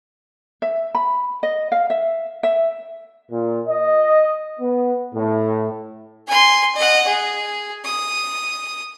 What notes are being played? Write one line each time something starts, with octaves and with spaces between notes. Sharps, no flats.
E5
B5
D#5
F5
E5
E5
A#2
D#5
B3
A2
G#5 C6
D#5 F#5
G#4
D#6